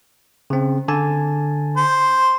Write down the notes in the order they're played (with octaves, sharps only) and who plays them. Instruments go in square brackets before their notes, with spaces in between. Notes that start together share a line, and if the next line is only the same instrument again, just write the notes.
[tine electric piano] C#3 C4
D3 G#5 A5
[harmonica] C5